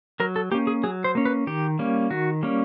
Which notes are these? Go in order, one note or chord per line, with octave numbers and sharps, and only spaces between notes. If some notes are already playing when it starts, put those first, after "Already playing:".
F#3 A#4
A4
A#3 C#4 G4
G#4
F#3 G#4
C5
A#3 C#4
B4
D#3 G4
G3 A#3 C#4
D#3 F#4
G3 A#3 C#4